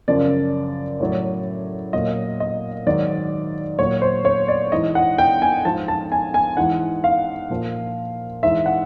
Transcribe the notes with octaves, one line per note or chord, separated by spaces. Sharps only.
F#2 C#3 F3 D5
A2 F#3
A#2 F#3 D#5
D#5
G#2 D#3 F#3 D5
A#2 F#3 C#5
C5
C#5
D5
G#2 E3 D#5
F#5
G5
G#5
G#2 F3 A5
A5
G#5
G#5
G#2 E3 F#5
F5
A#2 F3
G#2 E3 E5
F#5